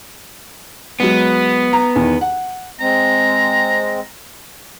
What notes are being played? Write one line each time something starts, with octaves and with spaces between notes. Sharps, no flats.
F#3 G#3 B3
A#5
E2 D#3
F#5
G#3 C4 A#5